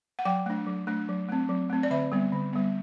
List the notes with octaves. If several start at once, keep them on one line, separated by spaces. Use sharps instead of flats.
F#5
F#3 G5
A3 D4
F#3
A3 D4
F#3
A3 C4
F#3
A3 C4
D5
D3 E5
G3 B3
D3
G3 B3